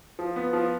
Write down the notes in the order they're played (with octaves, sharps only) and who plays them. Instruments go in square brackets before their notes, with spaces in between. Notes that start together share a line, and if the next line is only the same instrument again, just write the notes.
[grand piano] F3
B3
F3